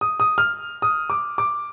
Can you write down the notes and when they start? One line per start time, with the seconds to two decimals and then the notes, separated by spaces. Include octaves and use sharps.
0.01 D#6
0.20 D#6
0.38 F6
0.82 D#6
1.10 D6
1.38 D6